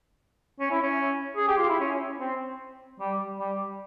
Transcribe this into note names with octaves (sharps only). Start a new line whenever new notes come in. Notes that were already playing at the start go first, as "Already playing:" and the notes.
C#4
E4
C#4
G#4
G4
F4
E4
C#4
C4
G3
G3